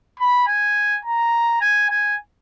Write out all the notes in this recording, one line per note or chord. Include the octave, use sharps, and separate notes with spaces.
B5
G#5
A#5
G#5
G#5